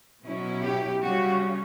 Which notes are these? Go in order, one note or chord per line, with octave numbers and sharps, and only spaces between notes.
B2 F#3 C#4 E4
G4
C#3 G3 C#4 F#4